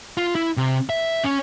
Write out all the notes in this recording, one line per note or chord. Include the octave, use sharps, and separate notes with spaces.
F4
E4
C3
E5
C#4